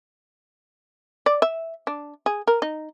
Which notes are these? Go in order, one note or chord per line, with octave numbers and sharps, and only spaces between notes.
D5
E5
D4
G#4
A#4
D#4